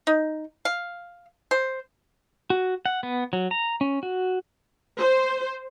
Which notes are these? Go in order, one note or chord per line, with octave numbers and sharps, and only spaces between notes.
D#4
F5
C5
F#4
F#5
B3
F#3
A#5
C#4
F#4
C5